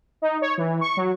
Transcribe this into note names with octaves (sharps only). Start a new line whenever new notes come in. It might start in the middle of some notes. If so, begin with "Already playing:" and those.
D#4
C#5
E3
C#6
F#3